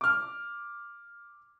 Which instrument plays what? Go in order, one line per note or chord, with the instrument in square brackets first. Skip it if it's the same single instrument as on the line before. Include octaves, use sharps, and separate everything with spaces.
[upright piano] D6 F6